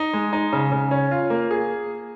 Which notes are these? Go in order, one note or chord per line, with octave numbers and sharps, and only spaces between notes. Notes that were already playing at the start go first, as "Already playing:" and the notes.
Already playing: D#4
G#3
D#4
C#3
C#3
C#4
F4
A#3
G#4